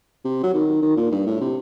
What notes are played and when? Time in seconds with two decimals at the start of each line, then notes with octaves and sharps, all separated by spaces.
0.25 C3
0.43 F#3
0.54 D#3
0.82 D#3
0.97 A#2
1.12 G2
1.26 A2
1.41 C3